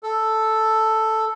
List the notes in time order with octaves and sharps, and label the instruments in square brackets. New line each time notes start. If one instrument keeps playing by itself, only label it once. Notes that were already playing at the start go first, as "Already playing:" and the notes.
[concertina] A4